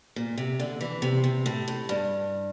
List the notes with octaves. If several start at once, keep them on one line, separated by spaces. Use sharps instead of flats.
A#2
C3
D3
E3
C3
C3
A2
A2
G2